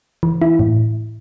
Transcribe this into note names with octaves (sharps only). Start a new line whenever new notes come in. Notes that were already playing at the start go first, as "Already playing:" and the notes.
E3
E4
A2